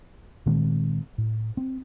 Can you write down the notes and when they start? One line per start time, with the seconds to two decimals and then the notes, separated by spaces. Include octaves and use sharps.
0.46 A#2 D#3 G#3 C4
1.18 A2
1.57 C4